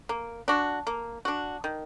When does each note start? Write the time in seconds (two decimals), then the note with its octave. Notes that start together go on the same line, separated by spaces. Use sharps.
0.09 A#3
0.48 D4 F#4
0.87 A#3
1.25 D4 F#4
1.64 D#3